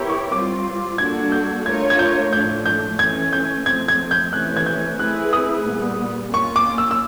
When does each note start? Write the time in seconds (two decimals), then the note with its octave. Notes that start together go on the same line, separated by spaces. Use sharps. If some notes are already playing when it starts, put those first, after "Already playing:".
Already playing: B3 E4 G4 A#4 C#5
0.09 C#6
0.32 G3 C4 F4 D6
0.98 G3 A#3 D4 F#4 A4 G#6
1.32 G6
1.66 A3 D4 F4 A#4 C#5 G#6
1.90 G#6
1.99 G6
2.33 A2 F3 A3 D4 G6
2.66 G6
2.99 E3 A3 C#4 G#6
3.33 G6
3.66 F3 A3 C4 G#6
3.88 G#6
4.11 G6
4.33 C3 E3 A3 C#4 F#6
4.56 G#6
4.66 G6
4.99 A3 C4 E4 G#4 B4 F#6
5.33 D#6
5.67 A#2 G3 B3
6.33 A#3 C#4 F4 C#6
6.56 D6
6.78 E6
6.91 E6